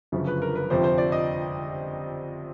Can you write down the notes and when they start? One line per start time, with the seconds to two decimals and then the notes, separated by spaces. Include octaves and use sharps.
0.12 G1 F#2 C#3 F3
0.27 B4
0.42 A#4
0.56 B4
0.70 G1 F2 C3 F3 C5
0.84 C5
0.98 D5
1.12 D#5